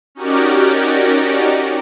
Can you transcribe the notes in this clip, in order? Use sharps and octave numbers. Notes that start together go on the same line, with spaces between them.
C#4 D#4 F#4 G4 A#4 D5